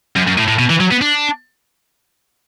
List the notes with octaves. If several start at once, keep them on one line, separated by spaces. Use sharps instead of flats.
F#2
F#2
A2
A2
B2
E3
F#3
B3
D4